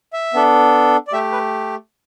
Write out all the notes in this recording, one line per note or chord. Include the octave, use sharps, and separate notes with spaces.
E5
B3 D4 A4
D5
A3 G4 E5
B4